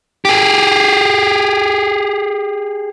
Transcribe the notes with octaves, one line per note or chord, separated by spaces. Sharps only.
G4 G#4